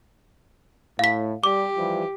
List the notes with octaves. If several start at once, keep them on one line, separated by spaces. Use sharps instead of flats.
A2 F5 B6
G3 G4 D6
E3 F3 G3